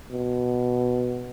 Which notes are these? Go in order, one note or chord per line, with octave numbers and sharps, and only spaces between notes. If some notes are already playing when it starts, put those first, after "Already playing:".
B2